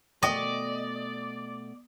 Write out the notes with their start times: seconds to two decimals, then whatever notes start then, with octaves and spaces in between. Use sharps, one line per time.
0.23 B2 A3 D5 D#5 G5 C#6